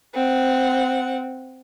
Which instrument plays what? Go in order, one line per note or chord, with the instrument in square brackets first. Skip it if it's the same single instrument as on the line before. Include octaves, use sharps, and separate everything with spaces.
[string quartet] C4 F#5